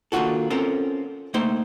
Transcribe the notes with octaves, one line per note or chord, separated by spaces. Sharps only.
D#3 A#3 D4 F4 F#4 A4
C4 C#4 F4 A4 A#4
A3 A#3 D#4 C5 C6